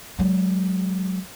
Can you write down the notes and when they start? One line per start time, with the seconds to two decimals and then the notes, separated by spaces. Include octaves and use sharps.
0.19 F#3 G#3